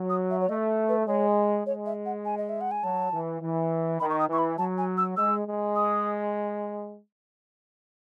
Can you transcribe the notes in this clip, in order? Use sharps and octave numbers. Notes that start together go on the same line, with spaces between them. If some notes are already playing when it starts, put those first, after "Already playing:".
Already playing: F#3
D#6
E5
C#5
A3 D#5
B4
G#3 C#5
G#3 C#5
E5
F#5
G#5
D#5
E5
F#5
G#5
F#3 A5
E3
E3
D#3 B5
C#6
D#6
E3 C#6
B5
F#3 A5
G#5
E6
G#3 E6
G#3
D#6